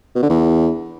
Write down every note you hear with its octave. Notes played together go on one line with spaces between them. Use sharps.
B2
D3
E2